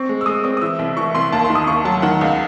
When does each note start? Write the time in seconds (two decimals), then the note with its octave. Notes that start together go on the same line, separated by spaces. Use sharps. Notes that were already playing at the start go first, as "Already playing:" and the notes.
Already playing: C4 C#6
0.09 G#3
0.21 E6
0.26 G#3 D#6
0.44 C4 D#6
0.57 D#6
0.61 E3 E6
0.79 C2 E6
0.97 E3 C#6
1.15 C2 C6
1.32 D#2 A5
1.44 C6
1.50 D#3
1.55 D#6
1.67 D#2 C#6
1.85 F#3 A5
2.02 D#3 F#5
2.21 C#2